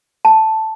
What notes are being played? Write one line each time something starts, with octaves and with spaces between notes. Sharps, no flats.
A5